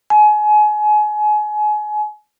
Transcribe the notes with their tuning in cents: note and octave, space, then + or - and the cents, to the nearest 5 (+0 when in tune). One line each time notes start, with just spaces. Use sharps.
G#5 +30